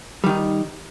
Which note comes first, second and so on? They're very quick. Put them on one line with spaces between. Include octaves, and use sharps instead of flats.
G3 D#3 D#4